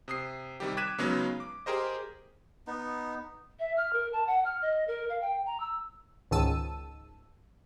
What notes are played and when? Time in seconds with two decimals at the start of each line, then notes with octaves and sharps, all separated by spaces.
0.08 C3 D#6 C7
0.60 C3 D#3 G3 G4
0.77 D6 F#6 G#6 B6 D#7 E7
0.98 C#3 F#3 G#3 B3 C#4 D#4
1.40 D6
1.66 G4 G#4 A#4 C5 D#5
2.67 B3 D#4
3.59 E5
3.77 F6
3.93 A#4
4.13 A5
4.27 F#5
4.45 F6
4.62 D#5
4.87 A#4
5.09 F5
5.21 G5
5.46 A#5
5.60 E6
6.31 C#2 G#2 D#3 A5 E6 D#7